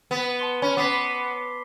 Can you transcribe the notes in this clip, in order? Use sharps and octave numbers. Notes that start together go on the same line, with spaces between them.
B3
A5 C6 G7
C#4 B5
B3 D6 B6 C7